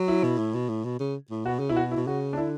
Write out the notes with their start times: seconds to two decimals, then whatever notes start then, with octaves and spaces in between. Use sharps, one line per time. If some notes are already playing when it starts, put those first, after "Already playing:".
Already playing: F#3
0.08 E4
0.24 B2
0.38 A2
0.54 B2
0.69 A2
0.85 B2
0.99 C#3
1.31 A2
1.45 B2 F#4
1.59 C#3
1.69 E4
1.72 B2 F#4
1.91 E4
1.97 B2
2.07 C#3 F#4
2.33 D4
2.37 D3 E4